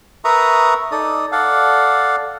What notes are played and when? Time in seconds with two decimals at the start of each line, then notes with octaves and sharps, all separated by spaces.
0.25 A#4 B4 E5 A#5 C#6 D#6
0.92 D#4 A4 D5 D#6
1.32 A4 D5 F5 F#5